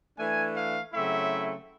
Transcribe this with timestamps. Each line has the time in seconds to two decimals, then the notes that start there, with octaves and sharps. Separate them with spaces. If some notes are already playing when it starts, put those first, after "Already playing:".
0.19 E3 A3 D4 G#5
0.56 F5
0.94 C#3 F#3 A3 C4 E4 E5